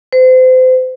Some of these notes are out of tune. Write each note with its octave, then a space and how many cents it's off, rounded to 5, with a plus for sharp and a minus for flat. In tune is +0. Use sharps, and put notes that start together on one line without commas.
C5 -30